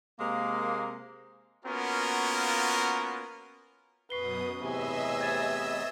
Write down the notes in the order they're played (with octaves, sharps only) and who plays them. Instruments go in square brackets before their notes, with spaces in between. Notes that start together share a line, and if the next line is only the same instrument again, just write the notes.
[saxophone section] C3 G#3 A#3
[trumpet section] A#3 B3 C#4 F4 F#4 A#4
[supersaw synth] F#2 B2 D#6 [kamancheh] B4 [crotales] C#6 C7 G7
[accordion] E2 A2 C3 [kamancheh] B4 G#5 [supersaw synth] D#5 E5 E6
[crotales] G#6 A6 E7